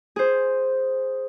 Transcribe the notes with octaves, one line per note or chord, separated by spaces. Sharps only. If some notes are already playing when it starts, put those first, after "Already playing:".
G#4 C5